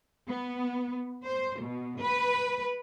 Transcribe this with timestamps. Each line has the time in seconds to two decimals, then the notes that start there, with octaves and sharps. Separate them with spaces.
0.29 B3
1.23 C5
1.60 B2
2.00 B4